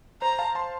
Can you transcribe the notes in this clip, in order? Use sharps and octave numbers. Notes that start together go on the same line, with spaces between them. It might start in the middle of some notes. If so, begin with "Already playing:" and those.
C5 A#5
F5 A5
A5 C6